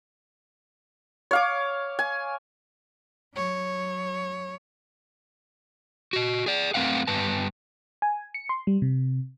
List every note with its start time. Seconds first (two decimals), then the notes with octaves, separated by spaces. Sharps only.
1.31 C#5 F5 D6
1.99 G#5
3.35 F#3 C#5
6.13 F#4 D#5
6.46 G#4 D5
6.74 F#2 A3 C4 B4 F5 F#5
7.07 G2 B3 B4 A5
8.02 G#5
8.34 C#7
8.49 C6
8.67 G3
8.82 C3